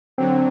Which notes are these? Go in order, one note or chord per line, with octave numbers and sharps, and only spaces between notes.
D3 F#3 C4